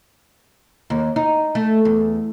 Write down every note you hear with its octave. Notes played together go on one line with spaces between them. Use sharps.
D#2
D#4
A3
E2